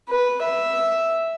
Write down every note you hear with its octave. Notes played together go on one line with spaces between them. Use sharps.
B4
E5